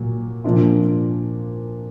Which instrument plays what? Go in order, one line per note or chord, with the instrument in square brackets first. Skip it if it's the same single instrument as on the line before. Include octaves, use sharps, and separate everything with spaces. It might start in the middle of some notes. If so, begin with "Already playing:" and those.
Already playing: [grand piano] A#2 F#3 A#3
A#2 F3 A#3 D4 F4